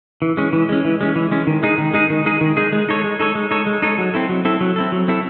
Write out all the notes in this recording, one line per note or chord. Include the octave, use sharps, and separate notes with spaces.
E3
G#3 C#4
E3
G#3 C#4
E3
G#3 C#4
E3
G#3 C#4
D#3
G#3 D#4 G#4
D#3
G#3 D#4 G#4
D#3
G#3 D#4 G#4
D#3
G#3 D#4 G#4
G#3
D#4 A4 C#5
G#3
D#4 A4 C#5
G#3
D#4 A4 C#5
G#3
D#4 A4 C#5
F#3
C4 E4 A4
F#3
C4 E4 A4
F#3
C4 E4 A4
F#3
C4 E4 A4